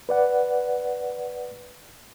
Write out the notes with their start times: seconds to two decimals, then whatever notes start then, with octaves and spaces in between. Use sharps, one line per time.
0.09 B4 D5 F#5